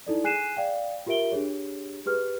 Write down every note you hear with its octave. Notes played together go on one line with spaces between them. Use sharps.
D#4 E4 A4 D5
G#4 G#5 F#6 C7 D#7 E7
D5 F5 G5
F4 G4 A#4 E5 D7 G7
D4 G4 G#4 C#5
G4 G#4 B4 F6